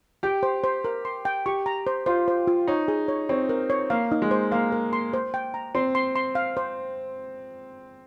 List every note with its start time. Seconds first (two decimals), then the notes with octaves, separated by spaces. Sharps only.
0.23 G4 G5
0.43 C5
0.64 C5
0.85 A#4
1.05 C6
1.25 G5
1.46 G4 C#6
1.66 A#5
1.87 C5
2.06 F4 C5
2.28 C5
2.47 F4
2.68 D#4 C#5
2.88 G#4
3.08 C#5
3.29 C4 C#5
3.49 A#4
3.70 C#5
3.90 A#3 F5
4.12 D#4
4.22 G#3
4.31 C5
4.52 A#3 F5
4.72 A#4
4.93 C6
5.13 C5
5.34 G5
5.54 A#5
5.75 C4 C6
5.95 C6
6.16 C6
6.35 F5
6.57 C5